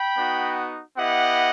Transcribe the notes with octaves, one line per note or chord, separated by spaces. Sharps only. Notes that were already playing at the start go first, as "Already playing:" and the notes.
Already playing: G5 B5
B3 D#4 F#4
B3 E4 G4 D#5 F#5